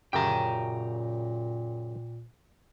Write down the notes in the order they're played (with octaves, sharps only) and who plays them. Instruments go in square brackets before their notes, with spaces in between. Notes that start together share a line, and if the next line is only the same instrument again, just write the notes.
[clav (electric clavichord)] F#2 C#3 G4 [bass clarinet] A#2 [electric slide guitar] G5 A#5